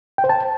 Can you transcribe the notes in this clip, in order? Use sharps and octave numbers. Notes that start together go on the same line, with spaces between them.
G5
C5
A5